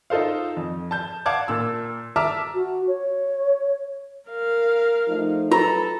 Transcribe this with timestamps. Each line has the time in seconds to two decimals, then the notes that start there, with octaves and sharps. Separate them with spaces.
0.10 D#4 F4 A4 C5 F5
0.57 F2
0.91 A5 G6
1.26 F5 F#5 A5 D6 G#6
1.48 A#2 E6
2.16 E5 A5 A#5 D6 E6 F6
2.54 F#4
2.88 C#5
4.29 A#4 F5
5.08 F3 A3 D#4
5.52 F#3 F4 A4 B4 A#5